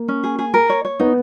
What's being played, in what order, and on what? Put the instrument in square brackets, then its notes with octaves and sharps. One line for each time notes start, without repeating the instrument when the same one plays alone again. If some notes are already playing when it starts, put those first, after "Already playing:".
Already playing: [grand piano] A#3
[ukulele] C#4
G#4
G#4
A#4
C#5
C#5
[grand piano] B3 [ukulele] D#4